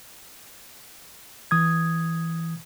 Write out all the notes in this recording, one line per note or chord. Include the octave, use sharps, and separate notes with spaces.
E3 D#6 G#6